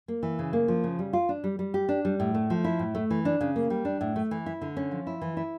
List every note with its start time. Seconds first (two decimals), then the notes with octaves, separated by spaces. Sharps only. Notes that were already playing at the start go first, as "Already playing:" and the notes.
0.08 A#3
0.23 E3
0.39 C#3
0.53 A#3
0.68 F3
0.84 C#3
0.99 G3
1.13 F4
1.29 D4
1.44 G3
1.59 G3
1.74 G4
1.89 D4
2.05 G3
2.20 A2
2.34 A3
2.50 F3
2.64 E4
2.79 A2
2.95 A3
3.11 E3
3.25 D4
3.41 C#3
3.56 A#3
3.70 G3
3.85 D4
4.01 A2
4.16 A3
4.31 E3
4.46 E4
4.61 D3
4.77 C#4
4.91 F3
5.07 E4
5.21 E3
5.37 E4